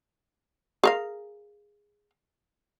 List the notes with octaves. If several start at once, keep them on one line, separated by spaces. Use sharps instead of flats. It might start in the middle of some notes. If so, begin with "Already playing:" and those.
G#4 A#4 F5